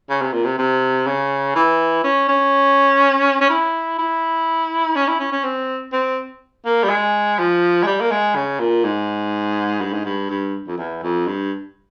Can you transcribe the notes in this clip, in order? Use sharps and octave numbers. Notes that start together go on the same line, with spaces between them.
C#3
C3
A#2
C3
C3
C#3
E3
C#4
C#4
C#4
E4
E4
C#4
E4
C#4
C#4
C4
C4
A#3
G3
G#3
F3
G#3
G3
A#3
G#3
C#3
A#2
G#2
G2
G#2
G2
G2
F2
E2
F2
G2